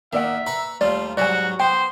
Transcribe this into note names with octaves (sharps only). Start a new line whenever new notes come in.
D#3 A#3 D5 E5 F#5
B4 A#5 B5 C#6
D#2 G3 A3 F4 D5
G#2 F#3 G3 F#4 D5 G#5
B3 C5 G5